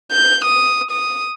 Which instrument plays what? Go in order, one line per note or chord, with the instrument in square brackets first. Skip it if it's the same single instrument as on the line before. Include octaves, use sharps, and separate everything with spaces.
[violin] G6
D#6
D#6